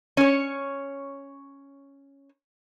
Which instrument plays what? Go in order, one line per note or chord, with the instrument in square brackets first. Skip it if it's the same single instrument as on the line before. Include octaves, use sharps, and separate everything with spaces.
[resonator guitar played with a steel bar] C#4 C#5